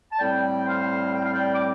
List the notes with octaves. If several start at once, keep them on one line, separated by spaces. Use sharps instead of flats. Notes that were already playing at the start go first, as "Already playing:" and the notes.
A5
A2 G3 C4 D5 G5
C5 F5
G5
F5
D5 G5
D6